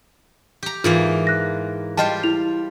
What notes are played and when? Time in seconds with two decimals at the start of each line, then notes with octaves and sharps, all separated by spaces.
0.63 G4 A#5
0.84 G#2 E3 A#3 F4
1.27 F#6 A#6
1.97 G3 F4 C5 D#5 G5 A5
2.23 E4 F7